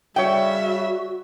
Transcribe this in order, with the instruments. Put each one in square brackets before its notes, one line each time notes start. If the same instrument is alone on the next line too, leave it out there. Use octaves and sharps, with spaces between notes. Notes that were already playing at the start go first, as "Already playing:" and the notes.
[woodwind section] C#3 G3 [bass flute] F#4 [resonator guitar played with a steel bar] C#5 G5 [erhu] E5